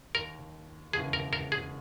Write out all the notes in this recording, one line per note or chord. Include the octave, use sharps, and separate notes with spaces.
D#2 D#3 A#3 A#4
E1 D#2 C#3 E3 G#4
A#4
A#4
G#4